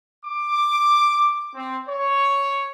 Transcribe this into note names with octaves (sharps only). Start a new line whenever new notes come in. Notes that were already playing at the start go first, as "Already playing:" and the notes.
D6
C4
C#5